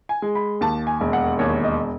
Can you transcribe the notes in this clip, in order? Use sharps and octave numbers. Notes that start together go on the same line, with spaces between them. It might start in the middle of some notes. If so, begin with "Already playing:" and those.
G#5
G#3
B5
D#2 A5
G#5
E1
F#5
D#2 C#5
D#5